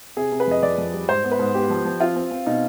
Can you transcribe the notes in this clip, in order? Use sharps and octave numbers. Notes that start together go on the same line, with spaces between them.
C3 G#4
C3
B4
F2 D#5
F2 D5
F2
G3
G#2 C5
B3
B4
G#2
B3 G4
F3
F3
C4 F4
C4
C4
B2 D#4